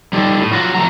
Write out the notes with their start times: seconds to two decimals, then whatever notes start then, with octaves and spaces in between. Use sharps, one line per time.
0.13 G3 D#4 G4 A4
0.40 A2
0.53 F#3 F4 F#4
0.75 F2 G#2 A3 A#5